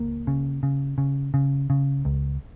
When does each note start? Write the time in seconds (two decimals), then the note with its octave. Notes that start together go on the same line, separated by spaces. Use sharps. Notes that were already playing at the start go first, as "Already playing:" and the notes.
Already playing: C#2 A#3
0.27 C#3
0.63 C#3
0.98 C#3
1.34 C#3
1.70 C#3
2.05 C#2